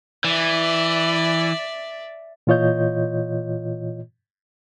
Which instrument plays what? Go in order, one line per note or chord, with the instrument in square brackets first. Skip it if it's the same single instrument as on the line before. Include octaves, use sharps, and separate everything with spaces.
[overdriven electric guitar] E3 [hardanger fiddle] D5 E5
[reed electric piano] A#2 E3 F4 C#5 D#5 G6